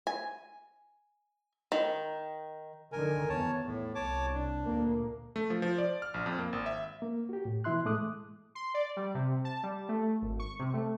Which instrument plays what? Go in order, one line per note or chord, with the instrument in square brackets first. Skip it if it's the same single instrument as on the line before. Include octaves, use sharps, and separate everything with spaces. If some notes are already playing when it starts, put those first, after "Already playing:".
[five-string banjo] G#5
D#3
[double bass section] D3 D#3 [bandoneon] A#4 G#5
[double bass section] E2 [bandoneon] C#5 A5
[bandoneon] A2
[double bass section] C2 [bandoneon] C#5 A5 D6
[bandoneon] D4
[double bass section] D2 A#2 A#3
[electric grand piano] A3
F3
F3
D5
F6
A#1
F2
A#3
G#1
E5
[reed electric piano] A#3
F#4 G4
A2
B2 E3 E4 E5 C6 F#6
A2 G#3 A3 D6 D#6 F#6
[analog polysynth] C6
D5
G3
C3
A5
G3
A3
G#1
C#6
C3
A3